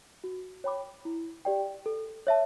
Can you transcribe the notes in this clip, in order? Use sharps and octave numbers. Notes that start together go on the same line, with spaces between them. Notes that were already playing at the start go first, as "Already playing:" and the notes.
F#4
C#5 G5 B5 D6
E4
G4 D5 G5
A4
C#5 E5 A5